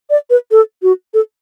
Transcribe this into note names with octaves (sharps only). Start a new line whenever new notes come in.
D5
B4
A4
F#4
A4